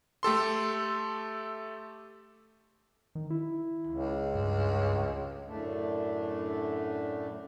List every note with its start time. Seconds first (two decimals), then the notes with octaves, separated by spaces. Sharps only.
0.23 A3 G4 A4 C6
3.15 D#3
3.30 E4
3.87 C#2
4.35 G2
5.48 F#2 A2 D3 A3 D4